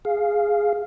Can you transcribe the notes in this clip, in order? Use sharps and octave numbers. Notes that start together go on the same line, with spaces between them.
G#4 F5